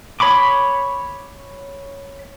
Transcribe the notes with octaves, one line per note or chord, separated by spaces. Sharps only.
C#5 B5 C#6 D6